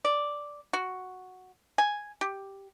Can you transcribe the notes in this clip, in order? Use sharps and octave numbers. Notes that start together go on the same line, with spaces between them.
D5
F#4
G#5
G4